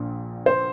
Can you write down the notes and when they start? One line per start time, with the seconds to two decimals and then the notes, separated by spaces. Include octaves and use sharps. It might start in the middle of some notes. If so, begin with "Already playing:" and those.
Already playing: A#1 A#2
0.46 C5